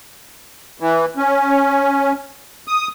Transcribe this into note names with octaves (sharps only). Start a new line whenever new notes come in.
E3
C#4
D#6